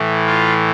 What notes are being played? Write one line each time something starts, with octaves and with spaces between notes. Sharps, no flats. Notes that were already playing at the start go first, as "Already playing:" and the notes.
Already playing: A2 E3
F4